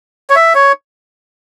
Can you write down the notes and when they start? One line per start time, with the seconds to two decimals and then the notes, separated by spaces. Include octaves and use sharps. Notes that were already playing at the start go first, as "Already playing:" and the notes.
0.30 C#5
0.36 E5
0.55 C#5